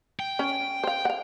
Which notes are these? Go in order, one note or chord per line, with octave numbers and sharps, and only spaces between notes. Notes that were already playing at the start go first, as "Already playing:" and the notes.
G5
C#4
C5 F5
F5 F#5